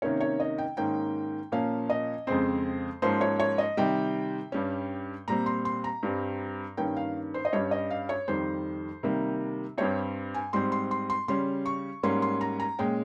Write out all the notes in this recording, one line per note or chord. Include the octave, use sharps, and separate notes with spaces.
C3 D#3 A#3 C#4 C#5
C#5
D#5
G5
G#2 D#3 A#3 C#4 G5
A#2 F3 A#3 C#4 F5
D#5
F2 C#3 G#3 C4 C5
G#2 F3 A#3 C#4 C5
C#5
C#5
D#5
C3 D#3 G3 G5
G2 G3 C#4
A#2 G3 C4 A#5
C6
C6
A#5
G2 G3 C4
G2 D#3 A#3 C#4 G5
F5
C5
D#5
G2 G3 C#4 C#5
D#5
F5
C#5
F2 D#3 G3 C5
C3 D#3 G3 A#3
G2 G3 C4 C#5
G#5
G#2 G3 C4 C6
C6
C6
C6
C#3 G3 C#4 C6
C#6
G#2 G3 A#3 C#4 C6
C6
A#5
A#5
A#2 G#3 C#4 G5